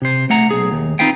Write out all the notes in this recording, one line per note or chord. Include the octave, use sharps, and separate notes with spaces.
C3 C5
A3 F#5 A#5
B1 G#4
D#2
C4 D#4 F4 B4 F5 G5